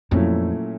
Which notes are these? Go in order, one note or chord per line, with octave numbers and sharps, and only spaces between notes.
F2 A#2 F#3 A3 C#4 E4